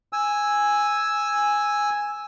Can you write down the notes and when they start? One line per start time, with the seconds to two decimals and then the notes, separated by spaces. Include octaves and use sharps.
0.13 G#5 E6